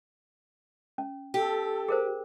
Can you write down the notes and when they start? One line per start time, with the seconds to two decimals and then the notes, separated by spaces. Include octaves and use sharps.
0.98 C#4
1.34 G4 A4
1.88 G#4 A#4 C5